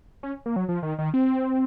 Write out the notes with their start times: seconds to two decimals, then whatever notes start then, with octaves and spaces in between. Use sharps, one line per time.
0.23 C#4
0.46 A#3
0.56 F#3
0.69 F3
0.83 D#3
0.99 D#3
1.14 C4